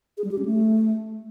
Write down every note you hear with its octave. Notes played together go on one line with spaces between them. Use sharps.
G#4
G3
G4
C#4
A3